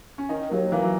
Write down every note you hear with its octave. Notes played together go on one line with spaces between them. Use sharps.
C#4
D#3 D#4
D#2 F#3
E3 A#3
F#3